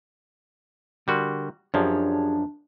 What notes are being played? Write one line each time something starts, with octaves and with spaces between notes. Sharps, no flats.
D3 G3 F#4 A#4 C6
F#2 F3 D4 G4 G#4 C#5